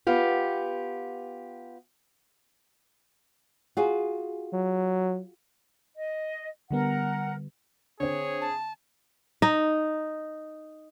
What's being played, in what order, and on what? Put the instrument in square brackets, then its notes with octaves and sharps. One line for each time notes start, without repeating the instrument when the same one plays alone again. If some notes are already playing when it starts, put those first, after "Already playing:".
[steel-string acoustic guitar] B3 F4 G4
[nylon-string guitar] F4 F#4 G#4
[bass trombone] F#3
[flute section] D#5
[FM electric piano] D3 G3 B3 [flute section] A#4 F#5
[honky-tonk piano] D3 C4 [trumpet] G#4 [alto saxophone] C#5
[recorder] A5
[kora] D#4